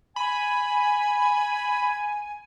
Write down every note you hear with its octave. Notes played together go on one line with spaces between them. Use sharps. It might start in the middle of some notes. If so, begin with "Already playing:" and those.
G#5 B5